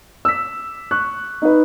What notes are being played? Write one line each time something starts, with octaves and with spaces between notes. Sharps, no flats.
E6 B6
C#6 F#6
D#4 B4